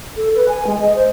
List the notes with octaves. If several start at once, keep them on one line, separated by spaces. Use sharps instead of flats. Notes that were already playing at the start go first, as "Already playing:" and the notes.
A4
B4
G#5
G#3
D#5
C5